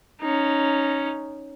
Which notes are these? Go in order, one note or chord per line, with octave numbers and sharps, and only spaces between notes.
C#4 D#4